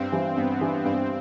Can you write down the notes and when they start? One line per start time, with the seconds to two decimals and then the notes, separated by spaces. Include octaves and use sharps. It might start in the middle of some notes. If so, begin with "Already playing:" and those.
Already playing: G2 C4
0.12 E3 G3 D4
0.36 G2 B3
0.61 E3 G3 D4
0.85 G2 C4